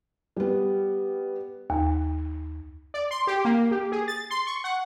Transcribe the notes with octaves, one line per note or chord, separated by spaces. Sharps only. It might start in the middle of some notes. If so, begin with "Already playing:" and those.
G3 B3
D#2
D5
C6
G4
A#3
G4
G#4
A6
C6
C#6
F#5